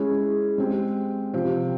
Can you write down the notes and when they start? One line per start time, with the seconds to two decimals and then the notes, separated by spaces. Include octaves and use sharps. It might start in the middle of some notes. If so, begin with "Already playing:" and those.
Already playing: G#3 C#4 E4 G#4
0.58 G#3 C4 G4
1.34 C3 F3 C4 G4